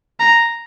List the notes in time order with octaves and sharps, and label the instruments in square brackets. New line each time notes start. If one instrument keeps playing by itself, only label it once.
[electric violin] A#5